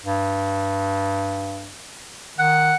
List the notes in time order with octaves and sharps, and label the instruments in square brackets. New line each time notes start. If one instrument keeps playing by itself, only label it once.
[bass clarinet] G2
[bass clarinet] D#3 [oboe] F#5